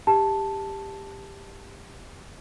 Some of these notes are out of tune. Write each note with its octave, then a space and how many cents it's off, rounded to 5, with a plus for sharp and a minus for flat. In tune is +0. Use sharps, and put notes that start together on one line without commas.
G4 +15 A5 +0